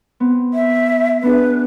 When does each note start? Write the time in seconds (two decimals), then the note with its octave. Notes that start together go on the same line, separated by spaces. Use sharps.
0.20 B3 C4
0.54 E5
1.23 B3 D4 G#4 B4